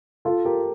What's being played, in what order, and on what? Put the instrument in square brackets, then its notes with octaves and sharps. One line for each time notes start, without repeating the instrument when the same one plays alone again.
[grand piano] F4 [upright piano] A4
[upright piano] G4 [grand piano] A#4